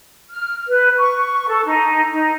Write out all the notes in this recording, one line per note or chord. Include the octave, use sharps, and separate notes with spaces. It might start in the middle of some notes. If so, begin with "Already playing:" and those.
F6
B4
C#6
A4
D#4
D#4